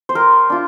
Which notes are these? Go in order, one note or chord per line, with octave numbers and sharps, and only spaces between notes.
C5
G3 A#4
D4 F4